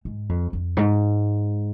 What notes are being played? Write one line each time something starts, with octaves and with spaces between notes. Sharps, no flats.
G#2
F2
F2
G#2